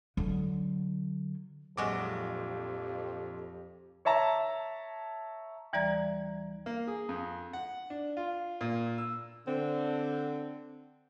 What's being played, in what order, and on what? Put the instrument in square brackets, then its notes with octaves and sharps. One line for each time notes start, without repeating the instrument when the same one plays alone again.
[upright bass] D3 F#3
[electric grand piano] A#1 D6 [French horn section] F2 [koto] F#3 G#3 F#4 [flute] G4
[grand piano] C#5 E5 A5 A#5
[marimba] D#2 E3 G3 D5 A#5 G#6
[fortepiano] A#3
G#4
F2
F#5
D4
F4
A#2
E6
[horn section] D3 C4